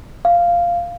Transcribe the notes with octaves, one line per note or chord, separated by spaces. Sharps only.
F5